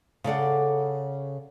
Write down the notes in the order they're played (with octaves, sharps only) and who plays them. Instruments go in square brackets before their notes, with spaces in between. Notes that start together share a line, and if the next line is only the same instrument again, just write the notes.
[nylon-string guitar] C#3 A4 D5 F#5